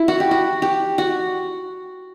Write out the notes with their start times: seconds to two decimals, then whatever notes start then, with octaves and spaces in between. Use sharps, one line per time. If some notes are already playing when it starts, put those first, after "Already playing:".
Already playing: E4
0.08 F#4
0.20 G4
0.31 F#4
0.62 G4
0.98 F#4